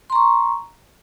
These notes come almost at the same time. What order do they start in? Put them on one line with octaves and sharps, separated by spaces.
C6 A#5 C#6